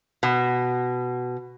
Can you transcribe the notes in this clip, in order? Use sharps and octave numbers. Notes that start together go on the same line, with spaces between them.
B2